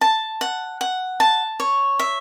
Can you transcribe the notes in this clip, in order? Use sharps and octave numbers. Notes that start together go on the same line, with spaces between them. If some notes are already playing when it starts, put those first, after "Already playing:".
A5
F#5
F#5
A5
C#5
E5